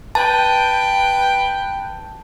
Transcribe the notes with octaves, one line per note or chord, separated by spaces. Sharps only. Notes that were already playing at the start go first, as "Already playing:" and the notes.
B4 G5 A5